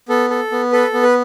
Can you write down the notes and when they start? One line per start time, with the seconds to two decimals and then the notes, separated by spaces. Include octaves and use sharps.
0.09 B3 A4
0.30 A4
0.52 B3
0.72 A4 B4
0.93 B3
1.03 B4